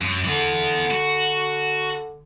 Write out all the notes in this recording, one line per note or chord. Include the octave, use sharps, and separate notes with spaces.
F#2
D3 E3 B3
F#4